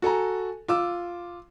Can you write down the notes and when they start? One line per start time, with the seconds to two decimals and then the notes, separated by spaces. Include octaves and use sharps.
0.02 F#4 A4 G#5 A#5
0.68 F4 D6 E6